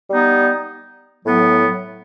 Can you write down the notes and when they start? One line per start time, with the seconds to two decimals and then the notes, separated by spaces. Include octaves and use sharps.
0.10 G3 B3 D#4
1.25 A2 F#3 B3